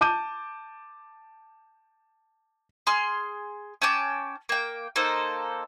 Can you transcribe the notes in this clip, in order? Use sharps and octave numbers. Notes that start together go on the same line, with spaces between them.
A5 D6 G6 D#7
G#4 C6 F6
C#4 G5 A5 D6
A#3 G5
A#3 D#4 A4 C5